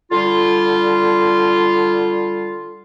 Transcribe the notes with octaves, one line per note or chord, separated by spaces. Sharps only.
D3 G3 F4